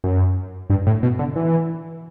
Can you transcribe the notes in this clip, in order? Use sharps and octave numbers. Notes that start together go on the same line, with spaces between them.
F#2
G2
A2
B2
D3
E3